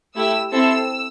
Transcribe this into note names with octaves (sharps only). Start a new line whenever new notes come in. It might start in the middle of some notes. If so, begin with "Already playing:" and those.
A3 E4 G4 E6
C4 E4 A4 E6